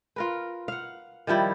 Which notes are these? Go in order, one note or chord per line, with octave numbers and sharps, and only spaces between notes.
F4 A#4 B4
F5 F#5
D#3 F3 G3 E4